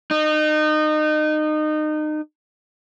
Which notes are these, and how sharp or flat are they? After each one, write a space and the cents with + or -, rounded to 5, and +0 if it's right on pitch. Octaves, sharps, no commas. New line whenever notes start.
D#4 -25